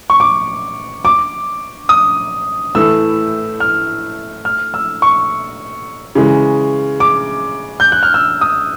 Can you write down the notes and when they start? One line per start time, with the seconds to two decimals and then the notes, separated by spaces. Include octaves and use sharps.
0.10 C#6
0.20 D6
1.05 D6
1.89 D#6
2.75 A2 E3 A3 E6
3.60 F6
4.45 F6
4.74 E6
5.02 C#6
6.15 C#3 E3 G#3
7.00 D6
7.80 G6
7.92 F#6
8.03 F6
8.14 E6
8.41 D#6